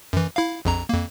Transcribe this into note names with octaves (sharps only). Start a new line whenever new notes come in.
F#2 E3
E4 F5
A#1 F2 A#5
F2 A#3